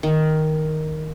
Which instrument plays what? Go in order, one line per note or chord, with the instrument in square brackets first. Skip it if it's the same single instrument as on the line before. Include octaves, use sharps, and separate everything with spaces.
[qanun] D#3